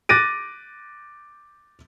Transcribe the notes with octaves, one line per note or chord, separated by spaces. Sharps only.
D6 F#6 A6 A#6 D7 D#7